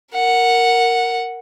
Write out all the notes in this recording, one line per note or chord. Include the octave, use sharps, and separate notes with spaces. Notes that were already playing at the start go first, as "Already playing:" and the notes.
A#4 F#5